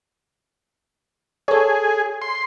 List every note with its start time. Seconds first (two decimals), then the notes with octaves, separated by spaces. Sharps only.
1.48 G#4 A4 C#5
2.22 C6